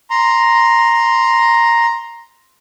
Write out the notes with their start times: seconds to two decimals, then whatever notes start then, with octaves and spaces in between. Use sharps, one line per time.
0.10 A#5 C6